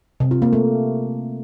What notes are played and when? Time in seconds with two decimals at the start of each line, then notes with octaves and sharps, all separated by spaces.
0.20 C3
0.31 F4
0.42 A#3
0.53 A3